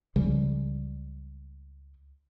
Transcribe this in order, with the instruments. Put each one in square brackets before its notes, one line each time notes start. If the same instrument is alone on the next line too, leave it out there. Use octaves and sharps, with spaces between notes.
[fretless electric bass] C#2 C#3 F3 G3